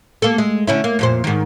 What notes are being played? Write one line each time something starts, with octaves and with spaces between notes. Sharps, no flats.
A#3 A4
G#3
D3 C#4 E4
A#3
F2 A#2 C5
G#2 D#3